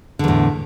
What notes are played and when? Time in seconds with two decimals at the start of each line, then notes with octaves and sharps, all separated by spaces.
0.19 D3
0.24 E2
0.28 A2